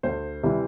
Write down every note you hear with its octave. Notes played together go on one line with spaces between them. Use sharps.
D2 C5
C3 E3 G3